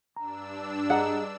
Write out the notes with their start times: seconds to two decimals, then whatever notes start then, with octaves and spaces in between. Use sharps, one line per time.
0.16 G2 D4 A#5 E6
0.90 G#4 D#5 F#5 A#5